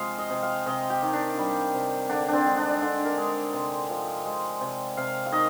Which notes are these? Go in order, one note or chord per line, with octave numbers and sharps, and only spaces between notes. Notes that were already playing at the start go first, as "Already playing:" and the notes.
Already playing: C3 F3 G#3 F5
D#5
C3
F5
C3 D#5
G4
D#3
D4
G3
C3
D3 D4
C4 D4
G#3
D4
D3 D4
A#4
G#3
C3
F3
G#3
C3
C3 F5
F5
D#3 D#5